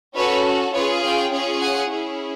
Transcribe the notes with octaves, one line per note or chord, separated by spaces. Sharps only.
C#4 F#4 A4 B4 C#5
C#4 F4 G#4 B4 C#5
F5 G5
C#4 F4 G#4
F#5 G#5
C#4 E4 G#4